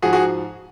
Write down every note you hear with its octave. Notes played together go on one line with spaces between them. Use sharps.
G#2 F3 F#4 G#4
F#4 G#4